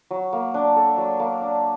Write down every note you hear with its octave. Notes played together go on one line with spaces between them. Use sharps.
F#3
A#3
D4
A4
F#3
A#3
D4